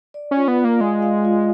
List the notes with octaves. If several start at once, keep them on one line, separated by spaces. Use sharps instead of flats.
D5
C#4
F4
B3
F4
A#3
G#3 F5
F5
F4